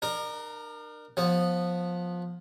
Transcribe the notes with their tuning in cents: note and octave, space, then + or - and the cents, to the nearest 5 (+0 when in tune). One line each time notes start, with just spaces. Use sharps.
D4 +45 A#4 +0
F3 +15 B3 -5